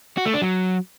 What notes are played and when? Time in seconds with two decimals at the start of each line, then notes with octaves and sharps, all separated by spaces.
0.18 F#4
0.26 A3
0.34 D4
0.42 F#3